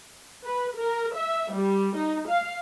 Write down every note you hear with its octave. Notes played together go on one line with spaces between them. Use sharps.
B4
A#4
E5
G3
D#4
F5